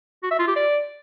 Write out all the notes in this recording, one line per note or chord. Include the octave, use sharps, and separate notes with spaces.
F#4
E5
F4
G4
D5